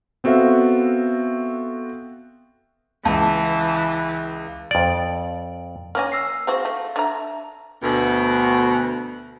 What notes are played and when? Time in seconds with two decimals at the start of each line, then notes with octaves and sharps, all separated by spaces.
0.24 B3 C4 F#4 A4 E5 F5
3.05 C#2 E3 A5
4.71 F2 D5
5.95 A#3 C#4 G#5 F6 A#6
6.12 E6 A#6 C7
6.47 G#3 C4 F#4 F5
6.65 A3
6.96 D3 E5 A5 A#5
7.83 D2 B2